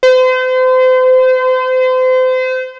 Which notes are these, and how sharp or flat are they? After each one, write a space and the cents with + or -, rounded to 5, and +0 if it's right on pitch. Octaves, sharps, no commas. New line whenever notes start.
C5 -35